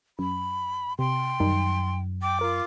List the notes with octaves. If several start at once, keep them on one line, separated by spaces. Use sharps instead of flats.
F#2 B5
C3 G5 C6
F#2 D#3 G3 D#4
G5 D6
F4 A#4